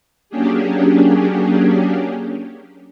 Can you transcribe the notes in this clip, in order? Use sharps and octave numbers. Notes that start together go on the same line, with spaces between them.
F#3 A#3 C#4 D4 G4 G#4